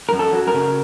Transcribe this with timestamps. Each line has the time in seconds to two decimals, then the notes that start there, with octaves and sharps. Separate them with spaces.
0.09 F#2 A#4
0.19 A4
0.33 F#3
0.48 A#4
0.54 C#3